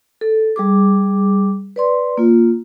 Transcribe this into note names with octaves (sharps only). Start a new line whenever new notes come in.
A4
G3 G#4 D6
B4 D5 C6
A#3 F4